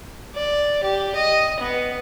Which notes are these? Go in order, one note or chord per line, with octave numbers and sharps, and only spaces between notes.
D5
G4
D#5
B3